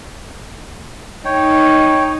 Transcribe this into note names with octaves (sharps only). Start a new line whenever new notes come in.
D#4 C#5 G5